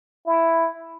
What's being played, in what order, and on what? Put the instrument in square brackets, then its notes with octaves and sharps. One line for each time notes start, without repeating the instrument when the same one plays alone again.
[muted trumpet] E4